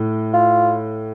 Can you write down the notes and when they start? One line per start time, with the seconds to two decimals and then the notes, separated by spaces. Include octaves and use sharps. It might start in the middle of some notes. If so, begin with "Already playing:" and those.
Already playing: A2
0.34 F4